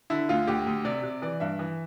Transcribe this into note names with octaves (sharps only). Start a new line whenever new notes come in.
D3 E4
D2 F4
D2 G4
D2
C3 D5
C3
E3 D5
G2 E5
E3